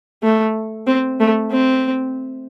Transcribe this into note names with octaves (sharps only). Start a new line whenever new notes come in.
A3
C4
A3
C4